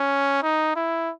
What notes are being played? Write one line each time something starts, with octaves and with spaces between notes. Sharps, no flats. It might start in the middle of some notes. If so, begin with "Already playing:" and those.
Already playing: C#4
D#4
E4